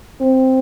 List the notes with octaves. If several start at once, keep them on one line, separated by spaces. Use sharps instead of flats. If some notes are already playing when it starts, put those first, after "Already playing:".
C4